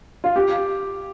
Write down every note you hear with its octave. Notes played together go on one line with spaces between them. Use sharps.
F4
G4